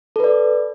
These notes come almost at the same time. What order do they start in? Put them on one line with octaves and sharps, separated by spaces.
A4 B4 D5